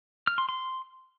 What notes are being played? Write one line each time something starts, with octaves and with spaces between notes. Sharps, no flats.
F6
C6
C6